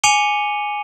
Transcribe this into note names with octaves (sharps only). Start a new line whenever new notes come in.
G#5 D6 C#7 D#7 F7 G7